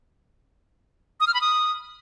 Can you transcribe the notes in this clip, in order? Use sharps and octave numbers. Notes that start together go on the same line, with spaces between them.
D#6
F6
B5
D#6